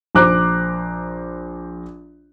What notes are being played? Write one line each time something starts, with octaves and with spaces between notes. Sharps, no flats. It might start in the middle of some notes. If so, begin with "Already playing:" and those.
A#1 C5 A#5 D6 F#6